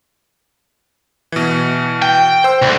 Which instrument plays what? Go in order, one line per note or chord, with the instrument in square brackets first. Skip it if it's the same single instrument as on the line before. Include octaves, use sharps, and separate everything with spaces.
[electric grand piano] B2 E3
[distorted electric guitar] G5
[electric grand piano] C5 E6
[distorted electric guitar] C2 D3